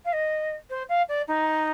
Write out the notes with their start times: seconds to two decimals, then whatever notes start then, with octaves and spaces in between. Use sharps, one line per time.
0.05 F5
0.13 D#5
0.69 C5
0.89 F5
1.08 D5
1.27 D#4